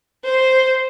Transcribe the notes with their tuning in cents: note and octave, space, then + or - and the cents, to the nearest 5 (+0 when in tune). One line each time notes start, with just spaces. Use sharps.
C5 +0